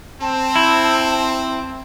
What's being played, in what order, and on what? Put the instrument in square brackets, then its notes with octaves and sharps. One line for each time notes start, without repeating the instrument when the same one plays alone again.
[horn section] C4 [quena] A5
[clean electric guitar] E4